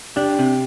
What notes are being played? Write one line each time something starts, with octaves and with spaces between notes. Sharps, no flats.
D4 G4
C3